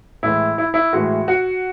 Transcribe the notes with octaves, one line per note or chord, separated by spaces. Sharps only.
A2 E3 G#3 E4
E4
E4
A2 E3 G#3 F#4
F#4